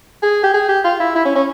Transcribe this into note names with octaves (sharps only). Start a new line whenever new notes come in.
G#4
G4
G#4
G4
F4
E4
E4
C#4
C#4